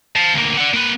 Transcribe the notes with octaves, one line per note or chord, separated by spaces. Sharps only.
F5 A5
D2 A#3
D5 F#5
A#3 B4